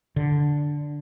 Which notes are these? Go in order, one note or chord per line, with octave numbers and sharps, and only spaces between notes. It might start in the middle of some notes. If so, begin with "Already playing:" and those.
D3